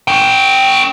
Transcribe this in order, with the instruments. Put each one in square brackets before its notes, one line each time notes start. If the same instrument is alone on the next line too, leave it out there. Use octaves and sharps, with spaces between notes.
[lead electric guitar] C#4 G5